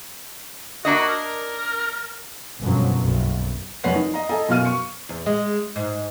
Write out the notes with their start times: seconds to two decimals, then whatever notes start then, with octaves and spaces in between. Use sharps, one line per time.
0.85 A#3 D4 F#4 D#5
1.08 A#4
2.61 G1 F#2 B2 F3 F#3
2.98 F#1 B1 F#2
3.84 F1 F#2 B4 C#5 F#5 C7
3.95 D#4
4.14 D#5 A#5
4.29 A4 D#5 G#5 A#5
4.49 F#2 B2 F5 F6 D#7
4.65 C#6 C#7
5.09 E2
5.26 G#3
5.76 G#2